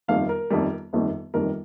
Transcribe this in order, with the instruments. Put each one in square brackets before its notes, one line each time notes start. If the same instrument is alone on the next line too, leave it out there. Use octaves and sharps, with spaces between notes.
[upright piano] G1 F2 D#3 G3 F5
A#4
G1 F2 D#3 G3
G1 F2 D#3 G3
G1 F2 D#3 G3 A#4